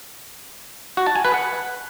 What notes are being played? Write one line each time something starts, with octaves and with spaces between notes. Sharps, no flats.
F#4
A5
G#5
B4
F#5